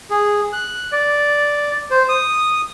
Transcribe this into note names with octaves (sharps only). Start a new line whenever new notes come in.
G#4
F#6
D5
C5
D#6